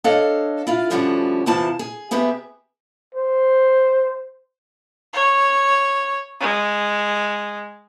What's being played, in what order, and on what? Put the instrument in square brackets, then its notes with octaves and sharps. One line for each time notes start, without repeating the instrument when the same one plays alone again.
[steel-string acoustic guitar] D4 A4 C#5 D#5 F5
E4 F4 F5
A2 D3 F3 G3 C#4 F#4
E2 C3 E3 F3 A5
G#4
C3 B3 G4 G#4 E5
[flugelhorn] C5
[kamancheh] C#5
G#3